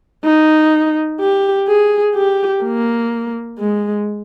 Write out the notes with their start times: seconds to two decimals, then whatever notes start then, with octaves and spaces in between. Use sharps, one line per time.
0.25 D#4
1.20 G4
1.68 G#4
2.15 G4
2.64 A#3
3.59 G#3